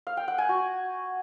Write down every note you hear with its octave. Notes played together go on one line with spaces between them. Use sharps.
F5
G5
F#5
G#5
F#4